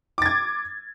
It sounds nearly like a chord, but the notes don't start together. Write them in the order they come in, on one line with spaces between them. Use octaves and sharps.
D6 A6 G#6